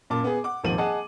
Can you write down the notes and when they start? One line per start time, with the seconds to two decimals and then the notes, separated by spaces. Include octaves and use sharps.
0.10 F#2 A#2 A#3 A5 D6
0.24 B3 G#4
0.44 F#5 D6
0.64 D#1 G#1 F3 D#7 F#7
0.78 G#4 D#5 F#5 A5